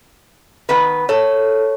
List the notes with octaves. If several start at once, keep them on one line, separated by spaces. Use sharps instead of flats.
D#3 B3 B4
A4 C#5